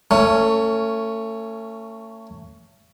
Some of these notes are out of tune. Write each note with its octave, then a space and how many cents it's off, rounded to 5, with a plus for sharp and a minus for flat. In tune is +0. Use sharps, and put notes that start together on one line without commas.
A3 +30 C#4 +0